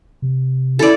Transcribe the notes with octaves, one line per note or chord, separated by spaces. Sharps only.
C3
E4 A4 D5